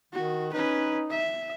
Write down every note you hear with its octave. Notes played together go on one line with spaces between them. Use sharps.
D#3 F#4
C#4 D#4 B4
E5